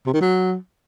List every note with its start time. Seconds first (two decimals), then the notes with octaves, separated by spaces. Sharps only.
0.06 C3
0.14 D#3
0.21 F#3